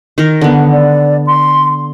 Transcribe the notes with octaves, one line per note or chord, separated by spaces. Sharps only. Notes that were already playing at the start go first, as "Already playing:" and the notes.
D#3 A#4
D3 B3
D5
C6